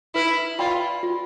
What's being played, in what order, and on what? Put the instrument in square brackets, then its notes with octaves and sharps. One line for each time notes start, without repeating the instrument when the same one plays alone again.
[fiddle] E4 [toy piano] B4
[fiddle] F4 [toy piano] D5 G5 B5
[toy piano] F4